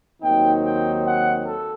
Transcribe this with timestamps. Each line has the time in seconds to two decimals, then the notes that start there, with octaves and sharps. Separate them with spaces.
0.22 D#2 D#3 F#3 C4 D#4 G5
0.63 G5
1.05 F#5
1.46 A4